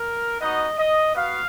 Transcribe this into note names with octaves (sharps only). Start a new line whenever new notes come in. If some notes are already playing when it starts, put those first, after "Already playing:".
Already playing: A#4
B3 D#4 F#4 D#5
D#5
B3 F#4 F5